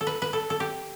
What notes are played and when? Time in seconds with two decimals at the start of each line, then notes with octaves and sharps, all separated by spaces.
0.01 A4
0.07 B4
0.22 B4
0.33 A4
0.50 A4
0.60 G4